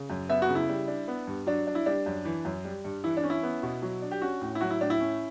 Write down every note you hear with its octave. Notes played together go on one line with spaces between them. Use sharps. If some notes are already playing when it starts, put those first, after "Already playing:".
Already playing: C#3
F#2
B3 E5
F#4
C#3
E4
G3
D4
B3
G2
F#3 D4
D4
E4
G3 D4
F#2
E3
F#2
G3
G2
E3 E4
D4
C#4
E4
B3
B2
F#3
D4
G4
C#4 F#4
A2
E4
F#3 F#4
E4
A2 D4
E4
C#4